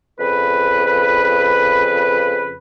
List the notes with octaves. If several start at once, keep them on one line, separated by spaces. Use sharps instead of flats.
F2 C#3 B4